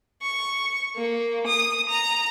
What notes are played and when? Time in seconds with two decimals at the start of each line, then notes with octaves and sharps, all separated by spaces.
0.23 C#6
0.96 A#3
1.47 D#6
1.89 A#5